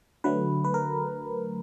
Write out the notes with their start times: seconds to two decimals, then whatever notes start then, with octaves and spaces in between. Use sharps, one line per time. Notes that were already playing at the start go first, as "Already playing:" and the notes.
0.24 D3 F#3 A3 B4
0.64 B4
0.74 A#4